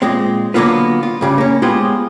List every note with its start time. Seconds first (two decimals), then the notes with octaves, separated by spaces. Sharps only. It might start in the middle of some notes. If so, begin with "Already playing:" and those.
0.02 A#2 G#3 C4
0.54 D3 F#3 A#3 B3 F4 B4
1.03 F4
1.21 G2 C#3 G3
1.38 A#3 C#4
1.62 G#3 B3 F4 G4 G#4 C5